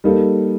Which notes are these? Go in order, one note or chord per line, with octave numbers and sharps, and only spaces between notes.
G3 A#3 D#4 A4